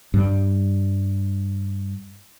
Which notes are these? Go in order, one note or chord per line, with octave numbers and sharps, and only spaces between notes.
G2 G3